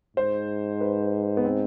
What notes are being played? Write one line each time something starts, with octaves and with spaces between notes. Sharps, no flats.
G#2 C5
B4
B3
C4